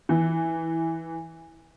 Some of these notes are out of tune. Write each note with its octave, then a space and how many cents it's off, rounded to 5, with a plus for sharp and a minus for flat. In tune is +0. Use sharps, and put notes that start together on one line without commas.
E3 -5